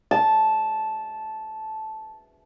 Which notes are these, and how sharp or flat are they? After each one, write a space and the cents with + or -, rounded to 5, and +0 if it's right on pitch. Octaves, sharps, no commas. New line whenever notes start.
A5 -10